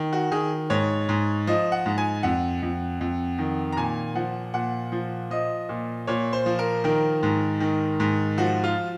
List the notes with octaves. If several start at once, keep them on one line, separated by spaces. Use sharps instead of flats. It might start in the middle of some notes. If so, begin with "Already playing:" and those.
Already playing: D#3
F#4
D#3 G#4
G#2 C#5
G#2
F3 D#5
F#5
G#2
G#5
F2 F#5
F2
F2
D#3
A#5
A#2 G#5
F3 F#5
A#2 F#5
F3
F3 D#5
A#2
A#2 C#5
C5
F3
A#4
D#3 A#4
G#2
D#3
G#2
F3 F#4
F4